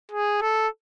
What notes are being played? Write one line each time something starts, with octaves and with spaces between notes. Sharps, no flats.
G#4
A4